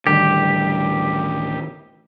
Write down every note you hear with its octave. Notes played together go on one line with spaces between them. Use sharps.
A1 D2 D3 D#3 G3 G4